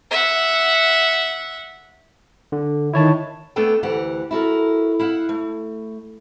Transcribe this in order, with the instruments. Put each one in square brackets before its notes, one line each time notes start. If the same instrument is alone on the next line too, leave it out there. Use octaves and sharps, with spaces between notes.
[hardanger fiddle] E5 F#5
[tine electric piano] D3
[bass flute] D#3 [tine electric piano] E4 C#5 A5
[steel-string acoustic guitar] A3 B3 D4 A4 G5
D2 E3 G4 F#5
E4 F#4 A4 A#4
E4 F5 F#5
A3